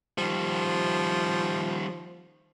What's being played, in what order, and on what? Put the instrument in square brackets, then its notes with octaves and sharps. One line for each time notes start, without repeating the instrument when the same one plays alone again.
[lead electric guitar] D#3 G3 [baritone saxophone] F3